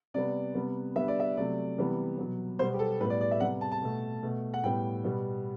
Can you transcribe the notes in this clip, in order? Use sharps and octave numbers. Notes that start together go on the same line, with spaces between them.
C3 G3 B3 D5
C3 G3 B3
D3 G3 B3 E5
D5
E5
C3 F#3 A3 D5
C3 E3 G3 B3
B2 F#3 B3
B2 G3 B3 C5
G4
A4
A2 G3 B3 B4
D5
D5
E5
C3 G3 B3 F#5
A5
A5
B2 A3
B2 A3
F#5
A2 G3 B3 G5
B2 G3 B3